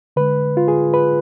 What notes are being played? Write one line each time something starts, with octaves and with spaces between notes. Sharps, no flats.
D3 G#3 B4
F4
G#4
B4